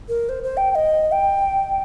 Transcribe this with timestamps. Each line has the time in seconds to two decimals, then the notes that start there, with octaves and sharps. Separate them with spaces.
0.08 A#4
0.29 C5
0.43 C5
0.57 G5
0.71 G5
0.75 D#5
1.12 G5